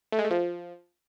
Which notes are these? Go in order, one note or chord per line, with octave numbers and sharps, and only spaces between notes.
A3
G#3
A3
F3